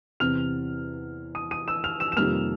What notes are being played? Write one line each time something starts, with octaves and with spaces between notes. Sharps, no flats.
E2 C3 E3 F6 F7
D#6 D#7
D#6 D#7
E6 E7
F6 F7
E6 E7
E7
F2 C3 D#3 G3 A#3 F6 F7